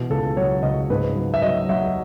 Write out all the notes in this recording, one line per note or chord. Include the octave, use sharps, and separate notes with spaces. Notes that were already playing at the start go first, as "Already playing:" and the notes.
Already playing: B2 E3
C#2 A4
F#3 C#5
C#2 D#5
G#2 B4
F#3
E5
F#3 D#5
F#3 E5